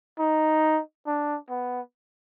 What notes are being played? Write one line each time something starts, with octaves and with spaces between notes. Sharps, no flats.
D#4
D4
B3